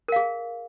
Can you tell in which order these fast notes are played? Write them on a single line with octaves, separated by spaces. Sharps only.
A#4 F5 G#4